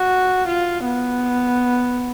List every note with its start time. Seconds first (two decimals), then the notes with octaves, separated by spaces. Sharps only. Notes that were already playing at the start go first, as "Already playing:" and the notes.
Already playing: F#4
0.48 F4
0.86 B3